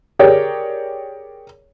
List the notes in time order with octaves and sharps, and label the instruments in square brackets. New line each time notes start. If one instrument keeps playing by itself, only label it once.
[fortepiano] G4 G#4 A#4 C#5 D5 G5